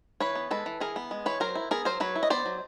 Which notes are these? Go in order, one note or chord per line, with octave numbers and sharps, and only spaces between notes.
E3 B4 C#5
B3
G#3 A4 B4
E3
E3 G#4 A#4
B3
G#3
E3 B4 C#5
F#3 A#4 C5
E4
B3 G#4 A#4
F#3 A#4 C5
F#3 B4 C#5
E4
D#5
B3 C5 D5
F#3